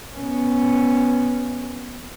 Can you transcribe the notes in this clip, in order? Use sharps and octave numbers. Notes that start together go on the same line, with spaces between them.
B3 C#4